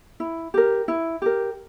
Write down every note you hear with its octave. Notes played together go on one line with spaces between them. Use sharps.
E4
G4 A#4
E4
G4 A#4